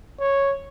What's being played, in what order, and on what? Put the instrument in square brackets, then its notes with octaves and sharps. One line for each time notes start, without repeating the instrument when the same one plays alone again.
[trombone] C#5